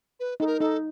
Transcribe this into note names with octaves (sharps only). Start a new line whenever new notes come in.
B4
D#4 A4
A#4
D#4 A4